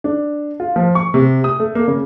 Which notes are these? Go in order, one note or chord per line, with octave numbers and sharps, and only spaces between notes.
D4
F4
F3
C#6
C3
D#6
A3
A#3
C#3